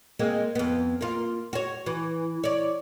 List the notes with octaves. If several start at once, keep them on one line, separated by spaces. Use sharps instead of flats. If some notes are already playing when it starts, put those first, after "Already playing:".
G#3 A#3 C4
F2 B3
A#3 F4
F#4 C#5
E3
C#5 D5